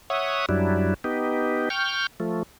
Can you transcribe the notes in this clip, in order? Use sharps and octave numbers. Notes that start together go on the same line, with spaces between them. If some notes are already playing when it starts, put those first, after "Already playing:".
C#5 E5 F#5 D#6
F#2 F#3 G3 D4 E4
B3 D#4 G4
G5 C#6 F6 G6
F3 A3